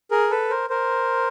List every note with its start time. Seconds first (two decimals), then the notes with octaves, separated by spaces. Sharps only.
0.11 G#4 A#4
0.31 A4 B4
0.50 A#4 C5
0.70 A#4 C5